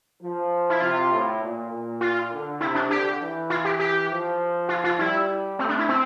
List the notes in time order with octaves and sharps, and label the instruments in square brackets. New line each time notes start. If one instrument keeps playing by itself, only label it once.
[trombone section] F3
[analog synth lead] E4
[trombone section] C3 [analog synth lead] F4
[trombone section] A2
A#2
A#2
[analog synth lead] F4
[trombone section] D3
[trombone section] C3 [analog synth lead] E4
[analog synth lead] D4
[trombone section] D3 [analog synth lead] G4
[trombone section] E3
[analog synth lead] F4
G4
G4
[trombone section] F3
[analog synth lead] F4
F4
[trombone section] G3 [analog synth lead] E4
[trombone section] A3 [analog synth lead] C4
[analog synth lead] D4
E4
C4